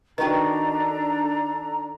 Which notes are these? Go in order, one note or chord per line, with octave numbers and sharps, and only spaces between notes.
D#3 D4 F#4 A4 B4 D5 G5 A#5